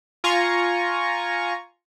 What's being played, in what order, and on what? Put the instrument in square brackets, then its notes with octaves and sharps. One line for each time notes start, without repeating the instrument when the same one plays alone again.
[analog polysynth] F4 G#5 A#5 C#6